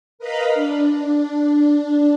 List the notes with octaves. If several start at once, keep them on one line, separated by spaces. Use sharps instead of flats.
A#4 B4 D#5 F5 B5
D4